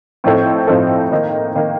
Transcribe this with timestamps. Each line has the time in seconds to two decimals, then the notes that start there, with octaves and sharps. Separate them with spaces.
0.24 A2 F3 C4 D#4 A4
0.67 A2 F3 C4 D#4 A4
1.12 D#3 A#3 D#4
1.55 D#3 A#3 D#4